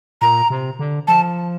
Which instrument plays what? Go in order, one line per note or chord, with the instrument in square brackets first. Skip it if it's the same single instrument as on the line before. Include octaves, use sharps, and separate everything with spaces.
[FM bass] A#2 [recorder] A#5
[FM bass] C3
D3
[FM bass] F3 [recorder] A5